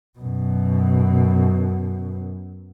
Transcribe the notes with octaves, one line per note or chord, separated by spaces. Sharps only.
F#2 B2